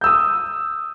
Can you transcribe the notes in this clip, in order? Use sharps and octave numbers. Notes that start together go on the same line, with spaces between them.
D#6 E6 G6